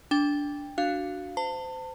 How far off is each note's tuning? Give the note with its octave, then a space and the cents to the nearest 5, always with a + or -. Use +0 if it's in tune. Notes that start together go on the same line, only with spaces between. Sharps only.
D4 -10 G5 +15
D4 +0 F#4 +0 F5 +0
C5 -30 A5 +30